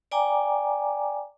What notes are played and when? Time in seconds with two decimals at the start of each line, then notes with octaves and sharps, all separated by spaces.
0.12 D5 G5 G#5 A#5 D6